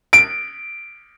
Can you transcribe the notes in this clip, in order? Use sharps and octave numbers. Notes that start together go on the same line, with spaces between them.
D7